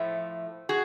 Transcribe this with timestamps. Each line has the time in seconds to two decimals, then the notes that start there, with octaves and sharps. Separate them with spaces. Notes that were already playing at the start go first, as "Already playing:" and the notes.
Already playing: A2 F3 A3
0.69 F#4 G#4